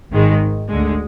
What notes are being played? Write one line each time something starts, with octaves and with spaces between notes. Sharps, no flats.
G#1 G#2 D#3 G#3
D2 D3 G#3